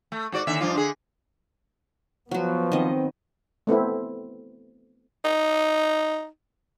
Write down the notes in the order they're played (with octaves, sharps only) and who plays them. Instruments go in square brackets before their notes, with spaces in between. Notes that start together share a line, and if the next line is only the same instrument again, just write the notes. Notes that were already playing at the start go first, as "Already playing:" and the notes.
[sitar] A3
G#2 F#4 D5
D#2 D3 E5
G2 F3 F4
D3 G#4
[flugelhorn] F3 [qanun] F#3 F#4 [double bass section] B3
[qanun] D#3 D#5 [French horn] C4
[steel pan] A3 B3 C4 E4
[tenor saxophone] D#4